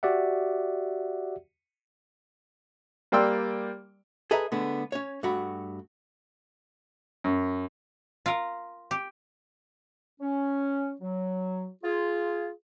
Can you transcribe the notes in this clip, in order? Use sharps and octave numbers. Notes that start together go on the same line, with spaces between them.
F#4 G4 D5 E5 F#5
G3 A#3 D5 G5 C6 E6
G#4 A4 B4 D#5 E5 A#5
D3 G#3 A3 B3
C#4 C#5
G2 A3 F#4 B5
F#2
F4 A#4
G4
C#4
F#3
F4 G#4